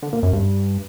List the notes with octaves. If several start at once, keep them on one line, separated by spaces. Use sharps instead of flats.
D3
A#2
F#2
G2